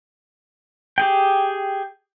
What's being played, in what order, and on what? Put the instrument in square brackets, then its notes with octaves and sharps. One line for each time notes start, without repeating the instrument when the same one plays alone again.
[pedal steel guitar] G4 G#4 G5